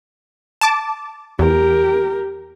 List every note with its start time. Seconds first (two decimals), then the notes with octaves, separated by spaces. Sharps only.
0.61 A5 D6
1.39 E2 G4 A#4